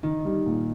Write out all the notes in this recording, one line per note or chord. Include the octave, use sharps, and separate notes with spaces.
D#3 D#4
G3
A#2